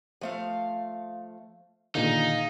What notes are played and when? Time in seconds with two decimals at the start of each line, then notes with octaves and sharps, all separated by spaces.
0.21 F3 A3 F5
1.95 A#2 D3 D#3 D#4 G#4 F5